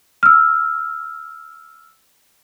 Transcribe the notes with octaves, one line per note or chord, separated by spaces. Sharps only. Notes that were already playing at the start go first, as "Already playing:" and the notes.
E6 F6